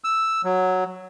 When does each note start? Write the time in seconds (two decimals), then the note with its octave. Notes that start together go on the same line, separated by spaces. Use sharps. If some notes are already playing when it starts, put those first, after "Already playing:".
0.04 E6
0.44 F#3